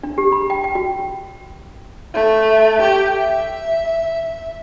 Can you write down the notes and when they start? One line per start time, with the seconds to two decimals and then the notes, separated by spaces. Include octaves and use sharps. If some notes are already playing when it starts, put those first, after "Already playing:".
0.03 D4
0.18 G4
0.32 B5
0.50 G5
0.64 G5
0.75 F#4
2.14 A3
2.81 G4
3.16 E5